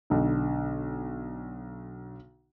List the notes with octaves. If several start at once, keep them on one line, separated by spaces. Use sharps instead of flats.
B1 D3